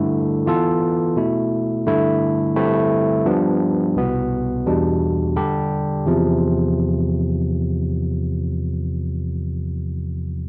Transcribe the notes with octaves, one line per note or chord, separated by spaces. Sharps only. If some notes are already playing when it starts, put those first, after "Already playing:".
Already playing: G2 D3 A3 E4
E3 B3 F4 A4
B2 A3 E4
G2 D3 A3 E4
G2 D3 A3 C4 E4
G2 F3 B3 D4
C2 B2 B3
E2 B2 G3 D4
D3 G3 D4 G4
E2 C3 F3